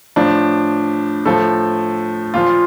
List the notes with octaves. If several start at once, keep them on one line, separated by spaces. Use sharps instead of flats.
A2 F3 D4
A2 F3 A4
A#2 F3 F4